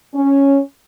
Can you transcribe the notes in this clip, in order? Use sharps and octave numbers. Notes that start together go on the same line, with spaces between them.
C#4